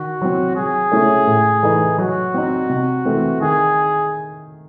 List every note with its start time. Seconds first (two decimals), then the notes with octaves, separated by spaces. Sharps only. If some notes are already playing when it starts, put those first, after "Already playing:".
Already playing: D#3 F#4
0.22 F#3 C4
0.56 F#3 G#4
0.92 A3 C#4 E4
1.27 A2
1.63 E3 A3 D#4
1.98 F#3 F#4
2.34 C4 D#4
2.69 C3
3.05 E3 A3 C4
3.41 D#3 G#4